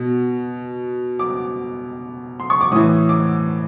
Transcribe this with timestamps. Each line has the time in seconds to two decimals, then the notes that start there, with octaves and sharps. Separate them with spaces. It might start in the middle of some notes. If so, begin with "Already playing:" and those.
Already playing: B2
1.19 D6
2.40 C6
2.50 C#6
2.61 D6
2.72 A2 E3 D#6
3.09 D6